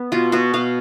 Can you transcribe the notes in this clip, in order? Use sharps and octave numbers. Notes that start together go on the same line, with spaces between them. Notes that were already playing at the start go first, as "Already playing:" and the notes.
Already playing: B3
B2 F4
B2 F#4
B2 F5